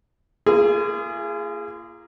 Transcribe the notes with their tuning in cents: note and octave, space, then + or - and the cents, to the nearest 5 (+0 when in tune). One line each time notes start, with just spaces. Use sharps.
A#3 +5 F4 -40 G#4 +0